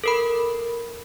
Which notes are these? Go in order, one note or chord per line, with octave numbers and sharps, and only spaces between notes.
A4 A#4 B5